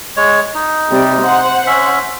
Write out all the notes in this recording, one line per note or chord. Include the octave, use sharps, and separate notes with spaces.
G#3 C#5
D#4
C3 G3
C5 F#5
C#4 E5